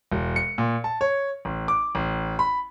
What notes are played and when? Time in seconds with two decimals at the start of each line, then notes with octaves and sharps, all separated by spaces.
0.12 E1
0.36 C#7
0.58 A#2
0.84 A5
1.01 C#5
1.45 A1
1.68 D6
1.95 A1
2.39 B5